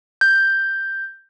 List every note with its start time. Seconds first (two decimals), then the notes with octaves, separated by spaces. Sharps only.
0.21 G6